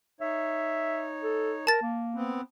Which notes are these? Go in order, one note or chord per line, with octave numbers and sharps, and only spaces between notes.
D#4 C#5 E5
A4
A#4 A5 A6
A#3
B3 C4